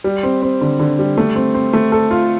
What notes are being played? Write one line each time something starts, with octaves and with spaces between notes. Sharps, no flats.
G3
C4
C4
D3
D3
G3
A3
C4
C4
A3
A4
F4